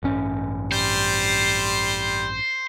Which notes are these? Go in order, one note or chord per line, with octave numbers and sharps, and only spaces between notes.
A1 G2 C#4
G3 C5